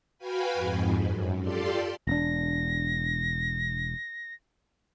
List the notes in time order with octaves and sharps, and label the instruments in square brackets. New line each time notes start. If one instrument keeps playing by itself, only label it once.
[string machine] F#4 B4 F5 G5 G#5 B5
F2 G#2
F#2
F4 G4 A4 D5 C6
[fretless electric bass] E1 D4 [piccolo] A#6